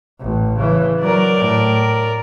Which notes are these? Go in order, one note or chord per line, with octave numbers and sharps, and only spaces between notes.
A1
C#3 E3
F#3 A#4 D5
A2